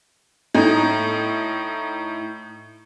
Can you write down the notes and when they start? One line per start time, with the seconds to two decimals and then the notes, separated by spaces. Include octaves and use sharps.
0.54 A2 D#4